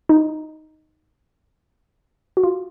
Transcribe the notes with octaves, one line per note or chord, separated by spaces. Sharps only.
D#4
F#4
F4